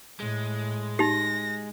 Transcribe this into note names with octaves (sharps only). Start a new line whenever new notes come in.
A2 G#3
D#4 G4 A#6